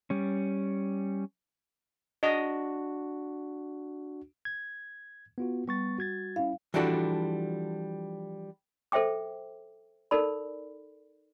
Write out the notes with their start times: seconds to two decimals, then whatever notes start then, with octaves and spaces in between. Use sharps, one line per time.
0.10 G3 C#4
2.23 D4 F#4 D#5
4.45 G#6
5.38 B3 F4 F#4
5.68 G3 B3 C#6 A6
5.98 F#4 G#6 A6
6.36 C#4 E4 F5
6.74 E3 F3 G3 D4 F#4 A4
8.92 A4 C5 E5 G5 D6
10.11 D#4 A4 A#4 D5 B5